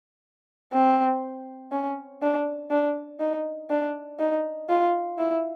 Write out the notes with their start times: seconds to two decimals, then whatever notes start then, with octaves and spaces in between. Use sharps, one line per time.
0.73 C4
1.72 C#4
2.22 D4
2.70 D4
3.20 D#4
3.70 D4
4.19 D#4
4.69 F4
5.18 E4